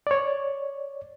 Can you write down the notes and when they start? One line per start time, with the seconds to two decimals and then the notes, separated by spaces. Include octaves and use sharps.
0.07 C#5 D5